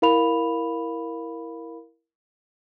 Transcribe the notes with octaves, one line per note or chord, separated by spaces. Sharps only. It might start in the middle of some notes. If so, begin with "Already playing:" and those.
E4 A#4 F5 B5 F7